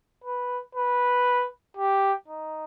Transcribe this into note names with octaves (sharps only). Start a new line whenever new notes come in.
B4
B4
G4
D#4